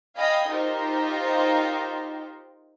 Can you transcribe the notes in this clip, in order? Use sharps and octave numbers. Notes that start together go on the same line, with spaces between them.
D#5 F5 G5 G#5 B5 D#6
D#4 F4 G4 A#4 C5